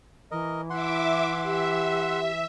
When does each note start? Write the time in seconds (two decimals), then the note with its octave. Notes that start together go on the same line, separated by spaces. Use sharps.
0.31 E3 A#4 D#5
0.70 E4 E5 F#5 C6 D6
1.44 G4 E5